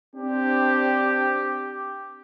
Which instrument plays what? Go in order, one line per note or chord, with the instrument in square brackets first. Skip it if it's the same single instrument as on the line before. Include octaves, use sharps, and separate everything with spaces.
[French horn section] C4 D4 [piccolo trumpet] G4